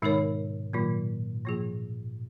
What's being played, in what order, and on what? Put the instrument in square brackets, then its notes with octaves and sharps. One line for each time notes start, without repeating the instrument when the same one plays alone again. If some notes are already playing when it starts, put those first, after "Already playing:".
[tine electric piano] G#2 B2 [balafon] D#3 G#3 D#4 A#4 C#5
[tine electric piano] A#2 [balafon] D#3 F#3 A#3 F4
[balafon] F3 A#3 F4 G#4